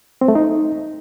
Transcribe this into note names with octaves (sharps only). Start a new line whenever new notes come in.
C4
A3
D#4